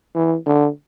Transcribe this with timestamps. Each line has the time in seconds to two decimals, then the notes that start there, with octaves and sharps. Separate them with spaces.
0.15 E3
0.46 D3